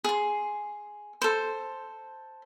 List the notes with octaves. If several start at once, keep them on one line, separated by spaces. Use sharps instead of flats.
G#4 C6
A4 C5